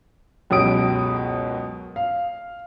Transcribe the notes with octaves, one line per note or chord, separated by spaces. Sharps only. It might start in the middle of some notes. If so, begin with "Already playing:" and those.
C#2 F#2 B2 G4 D#6 D7
F5